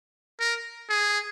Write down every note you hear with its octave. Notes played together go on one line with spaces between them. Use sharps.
A#4
G#4